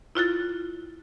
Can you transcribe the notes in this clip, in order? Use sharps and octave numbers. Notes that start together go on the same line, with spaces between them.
E4 F4 F#6 A6